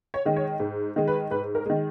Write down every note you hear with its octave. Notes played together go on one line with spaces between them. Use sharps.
C#5
D#3 G#3
C#5
G#2
D#3 G#3
B4
G#2 B4
A#4
D#3 G#3